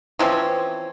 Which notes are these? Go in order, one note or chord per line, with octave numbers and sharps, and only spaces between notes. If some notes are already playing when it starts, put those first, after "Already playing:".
E3 F3 C4 C#4